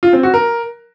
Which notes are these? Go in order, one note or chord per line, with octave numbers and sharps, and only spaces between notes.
F4
C4
F#4
A#4